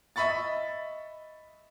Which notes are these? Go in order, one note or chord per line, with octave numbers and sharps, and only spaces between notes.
D#5 E5 B5 C#6 A6